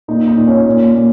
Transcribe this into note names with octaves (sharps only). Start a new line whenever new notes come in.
A#2 D#4
D#4
A#2
C#4
A#2
A#2